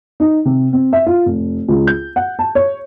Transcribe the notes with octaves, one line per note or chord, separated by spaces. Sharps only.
D#4
C3
C4
E5
F4
F1
C#2
G6
F#5
A5
C#5